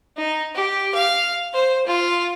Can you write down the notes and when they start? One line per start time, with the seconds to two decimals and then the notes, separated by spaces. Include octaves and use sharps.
0.17 D#4
0.55 G4
0.94 F5
1.53 C5
1.86 F4